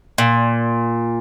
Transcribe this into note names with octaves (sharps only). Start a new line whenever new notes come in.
A#2